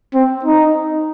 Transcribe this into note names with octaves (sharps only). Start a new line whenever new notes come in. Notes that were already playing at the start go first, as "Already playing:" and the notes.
C4
D#4